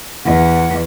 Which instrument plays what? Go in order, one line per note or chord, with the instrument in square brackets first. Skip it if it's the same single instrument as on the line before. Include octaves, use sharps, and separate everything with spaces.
[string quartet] E2 [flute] F#5